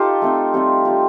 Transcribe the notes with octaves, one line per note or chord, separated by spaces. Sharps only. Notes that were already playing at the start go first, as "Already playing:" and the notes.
Already playing: D#4 F4 G4 A4
A3 C4 D#4
G3 C4 F4
G3 C4 F4